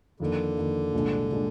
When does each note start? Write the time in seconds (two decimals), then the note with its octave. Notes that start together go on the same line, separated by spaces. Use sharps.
0.20 F2 D3 D#3 A#3
0.57 F2 D#3 A#3
0.93 C2 A#2 G#3 D4
1.31 A#2 G#3 D4